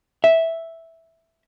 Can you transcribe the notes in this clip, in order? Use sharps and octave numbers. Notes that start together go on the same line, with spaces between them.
E5